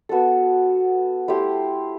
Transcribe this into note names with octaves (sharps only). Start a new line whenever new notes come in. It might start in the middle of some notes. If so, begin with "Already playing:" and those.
B3 F#4 A4
A3 E4 G4 C5